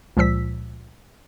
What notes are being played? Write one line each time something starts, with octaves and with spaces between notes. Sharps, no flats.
C#2 A#2 F3 E6 B6